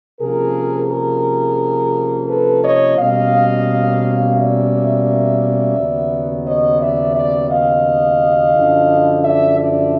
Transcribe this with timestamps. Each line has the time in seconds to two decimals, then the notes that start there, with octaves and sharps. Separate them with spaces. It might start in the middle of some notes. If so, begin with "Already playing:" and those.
0.20 C3 F3 A#3 C#4 G#4 A#4
0.89 G#4 A#4
2.28 A4 B4
2.62 C#5 D#5
2.97 B2 G3 A#3 C#4 D#5 F5
4.36 D5 E5
5.76 D#2 C#3 F#3 B3
6.45 C#5 D#5
6.80 D5 E5
7.15 D5 E5
7.49 D#5 F5
8.54 F#2 D3 F3
9.23 D5 E5
9.58 D5 E5